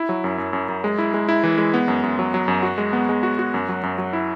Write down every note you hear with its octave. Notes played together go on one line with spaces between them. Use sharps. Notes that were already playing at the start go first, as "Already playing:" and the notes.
Already playing: E4
F#3
F#2
F#2
F#2
F#2
G#3
E4
G#3
E4
E3
G#3
B3
F#2
F#2
F#3
F#3
F#2
F#4
G#3
B3
G#3
F#4
F#4
F#2
F#3
F#2
F#3
E4